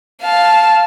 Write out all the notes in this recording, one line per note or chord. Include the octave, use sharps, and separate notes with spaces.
F5 A5